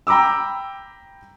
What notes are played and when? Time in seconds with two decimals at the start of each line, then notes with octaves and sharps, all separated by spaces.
0.07 G5 A#5 B5 D6 E6